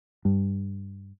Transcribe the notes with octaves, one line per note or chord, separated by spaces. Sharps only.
G2